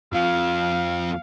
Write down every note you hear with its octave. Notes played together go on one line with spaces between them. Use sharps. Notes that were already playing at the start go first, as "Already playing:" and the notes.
F2 F3 F5